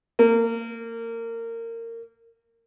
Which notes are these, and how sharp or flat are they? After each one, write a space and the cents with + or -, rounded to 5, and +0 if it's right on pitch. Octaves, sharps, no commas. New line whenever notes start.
A#3 -25